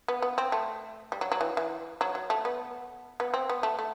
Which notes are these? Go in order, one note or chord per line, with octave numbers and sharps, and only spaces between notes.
B3
B3
C4
A3
G3
F#3
F#3
E3
E3
F#3
F#3
A3
B3
B3
C4
B3
A3
A3